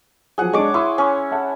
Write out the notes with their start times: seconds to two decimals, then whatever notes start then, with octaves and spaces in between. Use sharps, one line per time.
0.38 F3 F#3 G#4 F#5
0.53 G#3 D4 C#5 D6
0.74 E4 C6 C#6 D#6
0.98 C#4
1.31 E5 F#5 A5